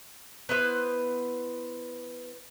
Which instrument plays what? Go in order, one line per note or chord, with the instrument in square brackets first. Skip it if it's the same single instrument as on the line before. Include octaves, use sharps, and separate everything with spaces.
[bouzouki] B3 E4 B4 C5